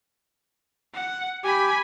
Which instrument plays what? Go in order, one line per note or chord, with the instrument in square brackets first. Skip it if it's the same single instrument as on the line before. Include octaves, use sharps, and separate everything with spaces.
[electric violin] F#5
[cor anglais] G4 [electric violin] G#5 B5